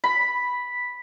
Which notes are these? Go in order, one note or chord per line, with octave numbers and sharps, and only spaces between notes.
B5